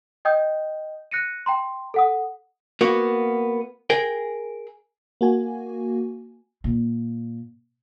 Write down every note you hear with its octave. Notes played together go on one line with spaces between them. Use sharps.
D#5 G5 D#6 G6
F#6 A#6 C#7 D#7
G5 A#5 C6
A4 F#5 D#6
A#3 B3 F#4
G#4 A#4 G5
A#3 F#4 G#5
A#2